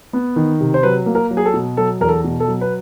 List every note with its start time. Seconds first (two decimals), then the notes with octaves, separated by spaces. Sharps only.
0.13 B3
0.36 D#3
0.61 C3
0.74 C5
0.83 F#3 B4
1.06 A#3
1.15 A#4
1.31 F#3
1.37 G#4
1.45 A4
1.54 B2
1.77 F#3 A4
2.00 E2 A#4
2.08 A4
2.24 B2
2.40 A4
2.48 F#3
2.61 B4